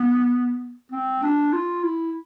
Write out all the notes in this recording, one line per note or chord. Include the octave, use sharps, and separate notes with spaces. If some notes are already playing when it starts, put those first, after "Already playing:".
Already playing: B3
C4
D4
F4
E4